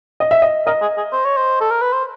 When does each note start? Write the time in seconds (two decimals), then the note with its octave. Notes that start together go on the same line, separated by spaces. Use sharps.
0.20 D#5
0.31 E5
0.42 D#5
0.66 A#4 D#5
0.81 G#4
0.97 G#4
1.12 C5
1.25 C#5
1.37 C5
1.61 A4
1.71 A#4
1.82 B4
1.93 C5